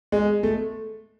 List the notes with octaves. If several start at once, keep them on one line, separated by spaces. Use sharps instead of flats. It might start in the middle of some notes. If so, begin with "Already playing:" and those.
G#3
A3